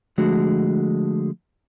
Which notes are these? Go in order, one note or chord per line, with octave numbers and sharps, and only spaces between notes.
D3 F3 G#3 A3 F#4